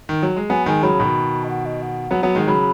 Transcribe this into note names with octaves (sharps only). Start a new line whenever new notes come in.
D#3
F#3
G#3
F#3 B3 G#5
D#3 G#3 G#5
C#3 F#3 B5
B2 D#3
D#5
F#5
D#5
F#5
F#3 B3
F#3 B3
D#3 G#3
C#3 F#3 B5